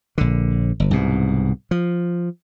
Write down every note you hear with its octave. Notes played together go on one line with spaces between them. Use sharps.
A#1 D3
G1
C2 G#2 B2
F3